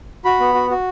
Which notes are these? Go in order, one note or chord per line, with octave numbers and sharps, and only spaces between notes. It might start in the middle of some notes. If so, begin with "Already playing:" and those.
F#4 B5
B3
F#4
F#4